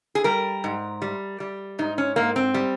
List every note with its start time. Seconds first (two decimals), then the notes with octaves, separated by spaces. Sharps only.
0.15 G#4
0.24 G3 A#4
0.64 G#2
1.02 G3
1.40 G3
1.79 G#2 D#4
1.98 C#4
2.16 G#2 A#3
2.36 C4
2.54 G3